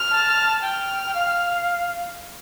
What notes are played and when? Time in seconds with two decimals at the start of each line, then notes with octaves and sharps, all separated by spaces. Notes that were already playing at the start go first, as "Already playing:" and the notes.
Already playing: F6
0.11 A5
0.62 G5 F6
1.06 G5
1.15 F5